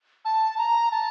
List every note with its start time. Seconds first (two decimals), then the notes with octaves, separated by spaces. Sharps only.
0.25 A5
0.58 A#5
0.91 A5